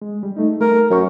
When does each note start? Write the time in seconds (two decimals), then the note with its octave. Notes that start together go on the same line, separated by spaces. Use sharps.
0.02 G#3
0.23 G3
0.36 A3 D#4
0.61 A3 A#4
0.90 F#2 F#3 C#6